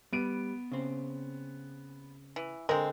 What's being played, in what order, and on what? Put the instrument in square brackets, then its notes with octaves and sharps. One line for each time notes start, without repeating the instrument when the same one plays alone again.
[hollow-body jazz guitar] G3 [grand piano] B3 D7 D#7
[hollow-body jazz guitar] C#3 C4
[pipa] E3
[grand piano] D3 [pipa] G#3 C4 [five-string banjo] A#4